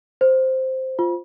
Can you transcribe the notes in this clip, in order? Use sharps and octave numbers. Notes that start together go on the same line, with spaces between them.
C5
F4